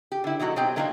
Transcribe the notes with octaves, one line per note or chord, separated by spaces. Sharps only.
G4
D3 E4
B2 F#3 D#4 F#4 A4
B2 F#3 C4 G4 G5
F#3 A3 A#3 D4 D#4 F4